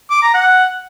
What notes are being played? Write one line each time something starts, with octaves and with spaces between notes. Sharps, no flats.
D6
A#5
F#5